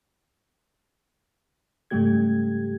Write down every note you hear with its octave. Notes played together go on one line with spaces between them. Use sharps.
G#2 C#3 G3 A3 G4 G#6